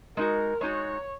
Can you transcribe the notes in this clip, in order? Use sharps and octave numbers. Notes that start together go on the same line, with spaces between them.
G#3 D#4 F#4 A#4
G#3 D#4 F#4 C#5